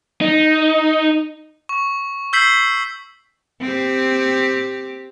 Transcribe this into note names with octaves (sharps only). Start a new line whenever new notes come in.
D#4
C#6
E6 G6 B6 C7 F#7
C4 G4